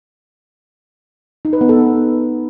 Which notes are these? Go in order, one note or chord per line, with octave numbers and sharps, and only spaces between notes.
D#4
B4
B3
A4